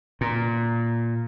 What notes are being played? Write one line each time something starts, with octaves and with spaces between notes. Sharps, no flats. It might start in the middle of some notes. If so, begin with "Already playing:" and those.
A#2